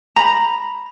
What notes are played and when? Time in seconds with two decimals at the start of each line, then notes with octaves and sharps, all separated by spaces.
0.16 A#5 B5